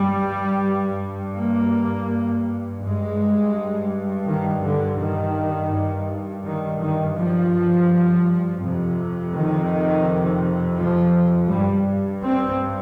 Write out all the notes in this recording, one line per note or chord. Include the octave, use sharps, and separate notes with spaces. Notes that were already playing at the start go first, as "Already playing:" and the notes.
Already playing: G2 G3
A#3
G2 G#3
D#3
D3
D#3
G2
D#3
D#3
F3
F2 C3
D#3
F3
G2 G3
C4